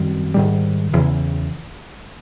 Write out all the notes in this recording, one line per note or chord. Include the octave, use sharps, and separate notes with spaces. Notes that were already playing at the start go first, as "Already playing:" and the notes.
Already playing: F#2 D#3 G3 C4
G#2 D#3 G3
E2 C#3 E3